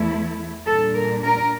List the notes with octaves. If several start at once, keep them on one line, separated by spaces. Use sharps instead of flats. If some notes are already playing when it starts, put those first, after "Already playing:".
Already playing: E2 E3 A3 E4
A#2 G3 D4 A4
A#4
A#4